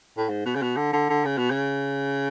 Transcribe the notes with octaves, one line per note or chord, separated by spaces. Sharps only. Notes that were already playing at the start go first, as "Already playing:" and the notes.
A2
G#2
B2
C#3
B2
D3
D3
D3
C#3
B2
C#3